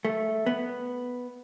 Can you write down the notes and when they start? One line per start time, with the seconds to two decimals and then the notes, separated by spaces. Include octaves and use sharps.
0.05 A3
0.46 B3